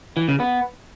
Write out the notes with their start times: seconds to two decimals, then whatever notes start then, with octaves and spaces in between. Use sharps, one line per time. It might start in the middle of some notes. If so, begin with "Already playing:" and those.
0.17 E3
0.28 C#3
0.40 B3